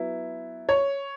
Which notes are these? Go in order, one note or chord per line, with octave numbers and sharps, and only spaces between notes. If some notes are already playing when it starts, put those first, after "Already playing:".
Already playing: F#3 B3 E4
C#5